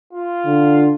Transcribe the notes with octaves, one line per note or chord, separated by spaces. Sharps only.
F4
D3